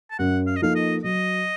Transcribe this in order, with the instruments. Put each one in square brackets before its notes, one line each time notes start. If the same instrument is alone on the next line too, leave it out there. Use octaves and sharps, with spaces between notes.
[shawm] A5
[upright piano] F#2 [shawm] F#5
[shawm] F5
D#5
[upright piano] F3 A#3 D#4 A4 [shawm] F5
[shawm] D#5
[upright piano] F#3 [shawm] D#5